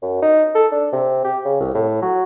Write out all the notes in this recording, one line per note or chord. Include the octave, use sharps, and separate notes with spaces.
F#2
D#4
A4
D4
C3
G4
C#3
C2
A2
F#3